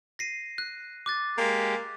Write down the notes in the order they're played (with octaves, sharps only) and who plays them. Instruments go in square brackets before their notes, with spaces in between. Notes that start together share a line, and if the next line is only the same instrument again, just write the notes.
[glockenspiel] A#6 C7 D#7
F#6
D6 F#6 A6
[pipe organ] G#3 G4 [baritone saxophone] A#3